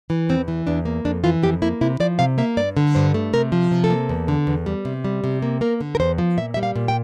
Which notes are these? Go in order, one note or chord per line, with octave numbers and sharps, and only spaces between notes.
E3
E2 C4
E3
E2 D4
A#3
F2 D4
E3 F4
F2 G4
A#3 E4
C3 E4
F3 D5
C3 F5
A#3 E5
G2 D5
D3
G2 C5
A3
C3 A#4
F3
C3
A4
A#3
E2
D3
E2
G3
C3
G3
C3
A#3
A#3 A#4
D3
A#4
E2 C5
F3
A#2 E5
G3 E5
F5
A#2
G5